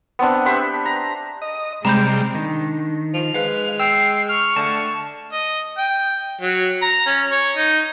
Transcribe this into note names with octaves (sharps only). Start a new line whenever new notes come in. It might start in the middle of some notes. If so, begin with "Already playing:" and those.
B3 C4 D4
G4 B4 C5 E5
A#5
D#5
C3 G3 G#3 A#5 B5 G6
D#3 D4
F3 F7
G#3 B4 F5
G5 E6 C7
C#6 F6
D3 A3 A5
D#5
G5
F#3
A#5
C#4
C#5
D#4